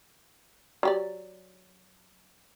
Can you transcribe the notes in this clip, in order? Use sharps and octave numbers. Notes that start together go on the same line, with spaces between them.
F#3 G4 D5